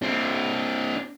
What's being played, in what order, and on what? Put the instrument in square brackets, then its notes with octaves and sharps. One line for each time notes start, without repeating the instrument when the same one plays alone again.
[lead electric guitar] C4 D4